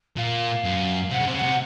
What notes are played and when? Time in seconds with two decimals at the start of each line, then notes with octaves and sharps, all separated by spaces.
0.17 A#2 F5
0.64 F#2
1.11 C3 F#5
1.20 C#3
1.27 C3
1.34 C#3
1.38 F#5
1.43 C3